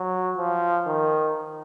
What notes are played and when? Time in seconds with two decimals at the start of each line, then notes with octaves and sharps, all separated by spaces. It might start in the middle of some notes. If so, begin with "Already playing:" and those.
Already playing: F#3
0.37 F3
0.87 D#3